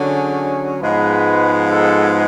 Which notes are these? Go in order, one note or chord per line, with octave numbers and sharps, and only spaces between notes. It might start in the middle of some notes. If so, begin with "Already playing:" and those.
Already playing: D3 F#3 C#4 G#4
G#2 F3 G#3 B3 B4
A4